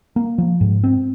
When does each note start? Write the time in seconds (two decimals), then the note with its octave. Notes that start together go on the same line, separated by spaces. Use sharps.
0.16 A#3
0.38 F3
0.61 G#2
0.84 C4